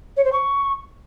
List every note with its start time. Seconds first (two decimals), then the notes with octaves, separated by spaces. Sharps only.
0.16 C#5
0.24 C5
0.32 C#6